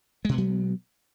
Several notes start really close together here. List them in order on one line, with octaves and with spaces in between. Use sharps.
G#3 B2 B3 F#3